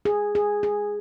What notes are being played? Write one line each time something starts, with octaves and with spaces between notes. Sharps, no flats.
G#4
G#4
G#4